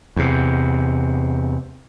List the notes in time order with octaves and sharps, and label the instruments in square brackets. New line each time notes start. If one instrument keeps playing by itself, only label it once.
[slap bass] E2 C3